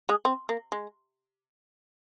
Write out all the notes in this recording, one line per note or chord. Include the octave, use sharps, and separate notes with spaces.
G#3 G#4
C4
A#3
G#3